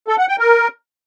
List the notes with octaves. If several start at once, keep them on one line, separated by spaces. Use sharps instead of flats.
A4
F#5
G5
A#4